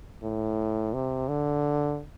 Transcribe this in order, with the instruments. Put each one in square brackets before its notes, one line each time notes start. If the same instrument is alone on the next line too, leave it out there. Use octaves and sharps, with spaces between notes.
[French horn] A2
C3
D3